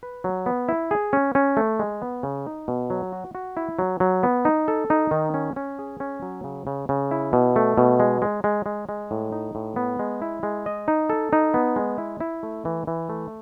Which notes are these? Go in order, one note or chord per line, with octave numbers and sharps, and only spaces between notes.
B4
F#3
B3
E4
G#4
C#4
C#4
A3
G#3
B3
C#3
D#4
B2
F#3
F#4
F#4
E4
F#3
F#3
B3
D#4
A4
D#4
D#3
C#4
C#4
G#4
C#4
F#3
C#3
C#3
C#3
E4
B2
A3
B2
G#3
G#3
G#3
G#3
G#3
A2
D#4
A2
B3
G#3
E4
G#3
D#5
D#4
A4
D#4
B3
G#3
E4
E4
A3
E3
E3
A3